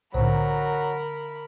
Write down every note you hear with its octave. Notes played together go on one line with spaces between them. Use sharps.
C2 A2 D3 F#3 A#4 C5 B5